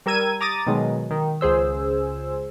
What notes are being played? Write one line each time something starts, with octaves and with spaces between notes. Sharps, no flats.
G3 A#4 E6 G#6 D#7
A#5 D6 D#6 A6 A#6 D#7
B2 D#3 F#3 G#3
D#3
C#2 G#4 C5 E6